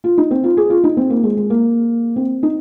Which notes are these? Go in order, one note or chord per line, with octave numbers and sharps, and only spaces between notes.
F4
D#4
C4
F4
G#4
F4
D#4
C4
A#3
G#3
G#3
A#3
C4
D#4